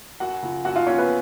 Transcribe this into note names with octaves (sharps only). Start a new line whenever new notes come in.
F#2 F#4 F#5
C#3 F3
F#2 F#4 F#5
F4 F5
C#3 F3 C#4 C#5
B3 B4